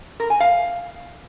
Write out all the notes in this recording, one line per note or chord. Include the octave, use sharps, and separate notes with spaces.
A#4
G#5
F5